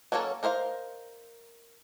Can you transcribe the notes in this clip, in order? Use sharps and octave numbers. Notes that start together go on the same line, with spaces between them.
F#3 A#3 C#4 A4 C#5
D#4 A#4 C5 E5 F5